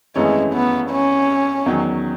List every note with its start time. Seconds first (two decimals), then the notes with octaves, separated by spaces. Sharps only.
0.16 G#1 F#2 E3 G#3 A3 C#4
0.54 B3
0.91 C#4
1.66 E2 D#3 F#3